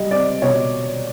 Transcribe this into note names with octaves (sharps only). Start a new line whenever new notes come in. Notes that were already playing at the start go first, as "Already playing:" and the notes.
Already playing: G3 D#5
C4 D5
B2 C#5